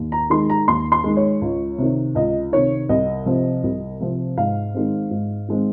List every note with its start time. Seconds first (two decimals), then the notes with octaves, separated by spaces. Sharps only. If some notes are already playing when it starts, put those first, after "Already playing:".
Already playing: D#2
0.12 A#5
0.30 D#3 G#3 C6
0.50 A#5
0.68 D#2 C6
0.92 C6
1.04 D#3 G#3
1.17 C#5
1.41 C#2
1.78 C3 D#3
2.15 C#2 D#5
2.52 C3 D#3 C#5
2.89 C2 D#5
3.26 C3 F3 C4
3.64 C2
4.00 C3 F3 C4
4.37 G#2 F5
4.74 D#3 G#3 C4
5.11 G#2
5.48 D#3 G#3 C4